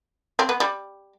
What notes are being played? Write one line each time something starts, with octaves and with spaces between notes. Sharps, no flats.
C4
B3
G3